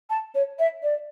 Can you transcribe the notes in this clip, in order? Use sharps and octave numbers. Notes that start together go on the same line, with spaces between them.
A5
C#5
E5
D5